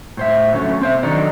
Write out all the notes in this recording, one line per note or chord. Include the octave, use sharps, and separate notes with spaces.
A2 C5 E5
D3 F#3 A3 C#4
C4 C5 E5
D#3 F#3 D4 D#4 A4 D5